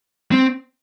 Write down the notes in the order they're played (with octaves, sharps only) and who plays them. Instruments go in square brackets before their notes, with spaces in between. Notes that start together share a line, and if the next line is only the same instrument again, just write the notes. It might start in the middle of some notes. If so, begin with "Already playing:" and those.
[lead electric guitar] C4